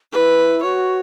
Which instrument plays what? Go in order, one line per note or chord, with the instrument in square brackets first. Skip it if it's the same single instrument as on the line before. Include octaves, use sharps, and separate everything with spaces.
[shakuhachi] E4 [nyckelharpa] B4
[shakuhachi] F#4 [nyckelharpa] C#5